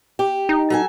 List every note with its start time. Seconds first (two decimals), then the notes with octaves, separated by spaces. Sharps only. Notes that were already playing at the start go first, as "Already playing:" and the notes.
0.19 G4
0.49 D#4
0.70 F#3 A4 G#5